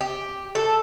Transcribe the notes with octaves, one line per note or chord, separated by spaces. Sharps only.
G4
A4